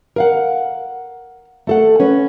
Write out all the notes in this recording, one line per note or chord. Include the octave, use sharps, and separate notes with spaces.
A#4 F5 F#5
A3 A4 F#5
C#4 B4